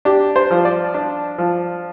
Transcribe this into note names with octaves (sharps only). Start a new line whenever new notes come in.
D4 G4
C5
F3
D5
D4
F3